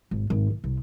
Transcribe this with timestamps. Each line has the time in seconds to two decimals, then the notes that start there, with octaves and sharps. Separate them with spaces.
0.11 G#1
0.30 G#1
0.50 A1
0.64 C2